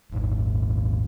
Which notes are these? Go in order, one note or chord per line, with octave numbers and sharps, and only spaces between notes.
D#1 G#1